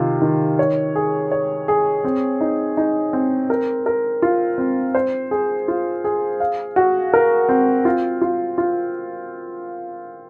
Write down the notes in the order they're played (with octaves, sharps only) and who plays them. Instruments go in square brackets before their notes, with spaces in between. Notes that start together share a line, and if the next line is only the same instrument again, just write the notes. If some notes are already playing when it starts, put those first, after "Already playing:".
Already playing: [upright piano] C3 D#3 F4
D#3
C#5
G#4
C#5
G#4
C4
D#4
D#4
C4
A#4
A#4
F4
C4
C5
G#4
F4
G#4
F5
F#4
A#4
C4
F4
F4
F4